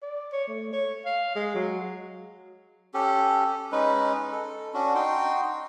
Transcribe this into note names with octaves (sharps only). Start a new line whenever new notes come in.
D5
C#5
A3
C#5
F5
G#3
F#3
C#4 G4 A4
G#3 C#4 D#4 B4
A4
C#4 D4 F#4
D#4 F#4 G5 C6